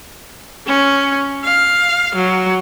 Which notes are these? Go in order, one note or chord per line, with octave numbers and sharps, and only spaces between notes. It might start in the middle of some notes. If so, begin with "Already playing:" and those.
C#4
F5
F#3